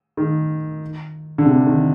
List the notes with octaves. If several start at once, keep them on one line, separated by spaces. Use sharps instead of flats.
D#3
D3
C3
D#3